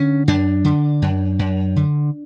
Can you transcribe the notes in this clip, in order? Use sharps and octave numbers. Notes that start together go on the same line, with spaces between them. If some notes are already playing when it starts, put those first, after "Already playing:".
Already playing: D3 C#4
F#2 D4
D3
F#2
F#2
D3